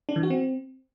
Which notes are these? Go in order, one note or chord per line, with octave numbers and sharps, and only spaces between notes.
D4
E3
F#4
C4